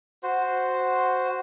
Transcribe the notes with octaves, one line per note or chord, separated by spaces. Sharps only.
F#4 C5